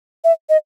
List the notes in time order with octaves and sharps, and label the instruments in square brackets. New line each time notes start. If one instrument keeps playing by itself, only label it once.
[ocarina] E5
D#5